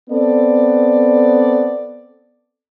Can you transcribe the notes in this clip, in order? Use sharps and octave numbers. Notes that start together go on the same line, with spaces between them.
B3 C4 A4 D5